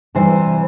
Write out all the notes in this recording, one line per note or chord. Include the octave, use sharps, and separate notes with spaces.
C3 E3 G3 C5